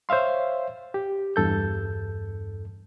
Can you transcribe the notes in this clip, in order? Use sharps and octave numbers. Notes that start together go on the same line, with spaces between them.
C5 C#5 E5 F5 C6
G4
E2 G2 A4 G6